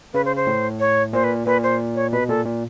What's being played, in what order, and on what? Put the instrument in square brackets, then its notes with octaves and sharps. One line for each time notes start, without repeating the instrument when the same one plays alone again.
[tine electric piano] C#3 [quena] B4
[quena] C5
C5
[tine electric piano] A2
[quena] C#5
[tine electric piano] A#2 [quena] C5
[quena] B4
[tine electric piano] A#2 [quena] B4
[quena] C5
C#5
[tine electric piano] B2 [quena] B4
[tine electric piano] A#2 [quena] A4
[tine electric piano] A#2